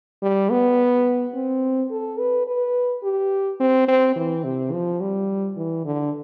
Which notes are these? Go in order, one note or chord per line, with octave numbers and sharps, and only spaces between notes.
G3
B3
C4
A4
B4
B4
G4
C4
C4
E3
C3
F3
G3
E3
D3